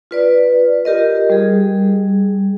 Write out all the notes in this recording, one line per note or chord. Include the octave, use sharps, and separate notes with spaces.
F4 B4 D5
F4 G4 A#4 D#5
G3 G#4